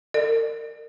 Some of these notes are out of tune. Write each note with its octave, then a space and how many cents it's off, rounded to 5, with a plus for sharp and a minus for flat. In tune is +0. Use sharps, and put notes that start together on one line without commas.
A#4 -35 D5 +40